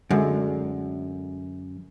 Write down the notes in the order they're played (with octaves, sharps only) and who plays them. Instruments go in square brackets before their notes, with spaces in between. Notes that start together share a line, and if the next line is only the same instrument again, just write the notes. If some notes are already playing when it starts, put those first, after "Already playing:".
[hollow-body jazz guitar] F#2 [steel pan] D3 G#3